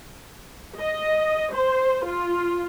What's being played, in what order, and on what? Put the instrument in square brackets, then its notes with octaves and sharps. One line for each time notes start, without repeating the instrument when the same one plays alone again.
[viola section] D#5
C5
F4